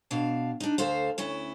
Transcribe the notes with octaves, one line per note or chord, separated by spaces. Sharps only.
B2 D4 F5
D4 D#4
D2 A4 C5 F5
D2 C#4 E4